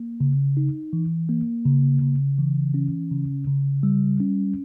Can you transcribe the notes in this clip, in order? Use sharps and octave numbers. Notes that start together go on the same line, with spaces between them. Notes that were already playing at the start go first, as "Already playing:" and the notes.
Already playing: A#3
C#3
D#4
E3
A#3
C#3
C#3
E3
C#4
C#3
C#3
G3
C#4